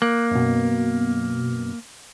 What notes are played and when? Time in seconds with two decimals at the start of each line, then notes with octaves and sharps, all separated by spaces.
0.02 A#3 F#6
0.31 F#2 B2